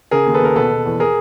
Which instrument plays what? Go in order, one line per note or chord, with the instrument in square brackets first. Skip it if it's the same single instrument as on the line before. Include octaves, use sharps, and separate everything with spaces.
[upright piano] C#3 G#4 A#4
D#2
A4 B4
D#2 A#4
B2 A4 B4
B2
E2
G#4 A#4